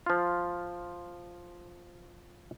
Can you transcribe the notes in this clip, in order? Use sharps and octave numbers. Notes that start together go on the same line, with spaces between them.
F3 F4